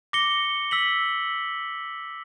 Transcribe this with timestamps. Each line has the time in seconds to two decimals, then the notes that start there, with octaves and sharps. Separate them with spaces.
0.13 D6 A#6 C#7 G7
0.71 E6 B6 F#7